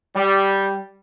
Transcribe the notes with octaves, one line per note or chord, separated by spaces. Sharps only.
G3